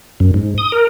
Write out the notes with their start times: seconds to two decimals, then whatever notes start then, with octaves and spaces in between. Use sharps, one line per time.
0.20 F#2
0.34 G#2
0.58 D#6
0.72 A#4